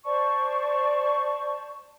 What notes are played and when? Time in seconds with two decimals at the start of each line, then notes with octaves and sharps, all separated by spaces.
0.05 C5 D5 A5 C#6